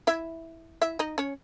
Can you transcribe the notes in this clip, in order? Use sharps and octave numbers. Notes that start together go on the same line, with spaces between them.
E4 E5
E4 E5
D#4 D#5
C#4 C#5